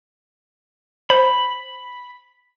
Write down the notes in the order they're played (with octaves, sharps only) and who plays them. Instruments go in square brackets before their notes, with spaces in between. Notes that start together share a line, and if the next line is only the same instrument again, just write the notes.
[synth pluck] C5 [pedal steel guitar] B5